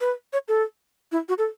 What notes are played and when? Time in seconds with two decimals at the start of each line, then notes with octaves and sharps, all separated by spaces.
0.01 B4
0.33 C#5
0.48 A4
1.12 E4
1.29 F#4
1.38 A4